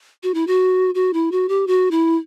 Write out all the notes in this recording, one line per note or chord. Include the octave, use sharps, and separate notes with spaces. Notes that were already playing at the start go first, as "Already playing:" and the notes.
F#4
E4
F#4
F#4
E4
F#4
G4
F#4
E4